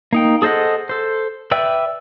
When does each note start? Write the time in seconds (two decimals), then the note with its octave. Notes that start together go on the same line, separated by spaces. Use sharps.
0.13 A#3 D#4 G5
0.42 G#4 A4 C5 D#5 F#5
0.89 A4 C5
1.51 B4 D5 E5 G5 E6